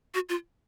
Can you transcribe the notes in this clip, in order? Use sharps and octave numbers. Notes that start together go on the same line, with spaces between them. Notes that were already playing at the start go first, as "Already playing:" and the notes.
F#4
F4